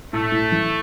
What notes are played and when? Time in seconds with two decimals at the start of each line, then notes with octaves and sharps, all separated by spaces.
0.13 A2 A3
0.32 A2
0.52 E3